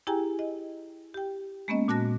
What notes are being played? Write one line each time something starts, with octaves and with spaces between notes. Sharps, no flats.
E4 G4 G#4 G5 G#5 A#5
D#5
G4 G5
G#3 A#3 B3 C#4 D#5
A#2 F#4 A5 F#6 A#6